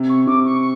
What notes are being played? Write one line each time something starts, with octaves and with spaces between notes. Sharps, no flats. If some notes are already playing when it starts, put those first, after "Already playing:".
Already playing: C3
C#6
C3 D6
C#6